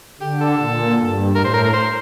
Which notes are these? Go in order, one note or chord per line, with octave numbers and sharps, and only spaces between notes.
D3 G4
A4
A#2
G2
A2 A#4
C5
A#4
A#4
C5